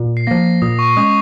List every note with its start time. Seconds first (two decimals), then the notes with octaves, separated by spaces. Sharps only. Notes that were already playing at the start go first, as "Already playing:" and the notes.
Already playing: A#2
0.17 C7
0.27 F3 A#3 A#6
0.62 A#2 D#6
0.79 C#6
0.97 G#3 C#4 D#6
1.06 C#6